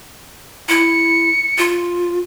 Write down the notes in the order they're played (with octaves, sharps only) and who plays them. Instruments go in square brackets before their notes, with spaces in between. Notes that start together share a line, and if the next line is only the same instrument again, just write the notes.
[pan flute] E4 [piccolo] C#7
[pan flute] F4